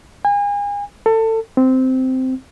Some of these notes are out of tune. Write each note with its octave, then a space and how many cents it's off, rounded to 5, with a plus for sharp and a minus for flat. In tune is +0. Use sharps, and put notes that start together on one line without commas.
G#5 -35
A4 +25
C4 -10